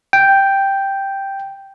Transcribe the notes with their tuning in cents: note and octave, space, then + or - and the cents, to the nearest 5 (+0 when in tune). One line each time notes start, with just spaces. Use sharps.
G5 +0